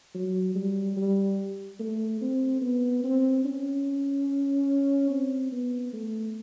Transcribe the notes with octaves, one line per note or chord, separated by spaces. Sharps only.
F#3
G3
G3
A3
C4
B3
C4
C#4
C4
B3
A3